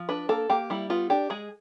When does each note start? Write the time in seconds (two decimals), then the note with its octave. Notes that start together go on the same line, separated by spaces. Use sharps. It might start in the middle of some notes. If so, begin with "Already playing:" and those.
Already playing: F3
0.09 D4 B4
0.29 A#3 A4
0.50 A#3 G4
0.70 G3 E4
0.90 B3 F4
1.10 D4 G4
1.30 G#3 G#4